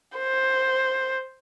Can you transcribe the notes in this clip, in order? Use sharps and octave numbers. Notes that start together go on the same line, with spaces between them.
C5